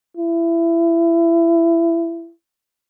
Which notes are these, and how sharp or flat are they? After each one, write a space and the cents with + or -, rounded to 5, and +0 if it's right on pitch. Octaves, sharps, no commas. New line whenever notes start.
E4 +25